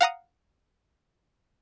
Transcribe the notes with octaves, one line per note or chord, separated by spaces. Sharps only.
F5 F#5 A#5 D#6